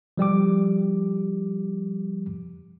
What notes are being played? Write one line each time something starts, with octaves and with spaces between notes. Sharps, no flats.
F3 G3 G4 D6